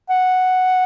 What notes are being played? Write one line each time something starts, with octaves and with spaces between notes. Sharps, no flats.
F#5